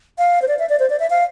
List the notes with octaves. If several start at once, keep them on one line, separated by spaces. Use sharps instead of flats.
F5
C5
D5
E5
D5
C5
D5
E5
F5